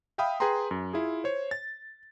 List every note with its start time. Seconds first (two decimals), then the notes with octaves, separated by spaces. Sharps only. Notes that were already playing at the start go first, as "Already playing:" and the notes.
0.18 E5 F5 G5 B5 D#6
0.40 G#4 B4 G5 A#5 C6
0.71 F#2
0.93 E4 F4 G#4
1.24 C5 C#5
1.51 A6